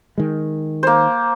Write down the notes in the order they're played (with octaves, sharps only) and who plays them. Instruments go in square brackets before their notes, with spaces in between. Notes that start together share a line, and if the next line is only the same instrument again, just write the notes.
[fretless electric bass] D#3 G#3
[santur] A#3 C5